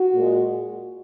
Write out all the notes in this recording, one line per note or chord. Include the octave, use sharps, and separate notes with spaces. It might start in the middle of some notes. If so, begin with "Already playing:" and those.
Already playing: F#4
A#2 G#3